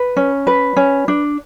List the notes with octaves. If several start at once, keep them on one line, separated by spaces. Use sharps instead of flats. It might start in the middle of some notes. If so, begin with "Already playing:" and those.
Already playing: B4
C#4
B4
C#4
D4